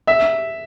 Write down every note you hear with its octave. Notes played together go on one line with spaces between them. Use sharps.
E5